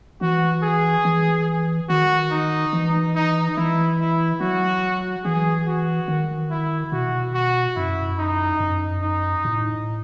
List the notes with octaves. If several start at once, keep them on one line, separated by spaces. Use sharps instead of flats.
E3 F#4
G#4
E3
D#3 F#4
D#4
E3
D#4
E3 E4
E4
F#3 F#4
E3 G#4
F#4
D#3
E4
B2 F#4
F#4
F#2 E4
D#4
F#2
D#4
A2